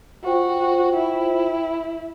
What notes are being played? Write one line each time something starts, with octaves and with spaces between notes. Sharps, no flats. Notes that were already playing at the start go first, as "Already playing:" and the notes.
F4 F#4 C5 G5
E4